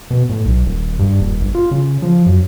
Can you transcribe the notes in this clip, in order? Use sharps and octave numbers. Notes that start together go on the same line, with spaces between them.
B2
A2
B1
D#1
G2
D#1
G1
F4
C#3
F3
F#2